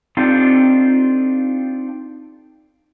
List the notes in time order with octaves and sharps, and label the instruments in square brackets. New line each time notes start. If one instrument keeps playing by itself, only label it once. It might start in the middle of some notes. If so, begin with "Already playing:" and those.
[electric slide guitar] C4 D4 D#4 F4 G4 A4